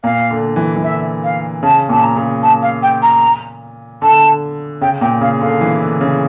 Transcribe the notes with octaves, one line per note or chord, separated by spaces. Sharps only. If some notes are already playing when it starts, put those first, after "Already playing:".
A#2 F5
D3
E3
E3
D3 E5
F5
C#3 A5
A#2 A5
A#5
C#3
A5
F5
G5
A#5
D3 A5
C#3 G5
A#2 G5
C#3 F5
D3 F5
E3
D3
C#3